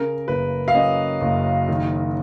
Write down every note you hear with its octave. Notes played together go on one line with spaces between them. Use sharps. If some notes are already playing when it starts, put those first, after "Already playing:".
Already playing: C#3 A#4
F#1 B4
F5
F#2 D#5
F#1
D#3